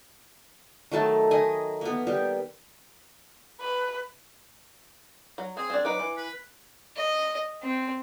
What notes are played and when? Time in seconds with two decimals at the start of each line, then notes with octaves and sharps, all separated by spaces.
0.92 D#3 F#3 A3 A5
1.31 D#3 D#5 G#5
1.81 A#3 B3
2.07 G3 G4
3.60 B4
5.38 F#3
5.57 C4 G#4
5.70 C4 D4
5.85 F#3 D#4 B4 D6
5.99 E3
6.17 B4
6.96 D#5
7.63 C4